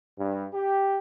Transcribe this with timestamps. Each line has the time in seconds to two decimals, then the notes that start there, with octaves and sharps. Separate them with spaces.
0.19 G2
0.54 G4